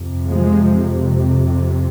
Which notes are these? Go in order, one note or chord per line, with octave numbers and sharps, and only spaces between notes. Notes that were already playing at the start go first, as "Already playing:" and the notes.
Already playing: F2 C3
F3 G#3